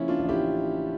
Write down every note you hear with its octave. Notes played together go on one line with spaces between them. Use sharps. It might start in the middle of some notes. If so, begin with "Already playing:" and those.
Already playing: C#3 F3 A#3 C#4 E4
D4 F4
A1
E4 G4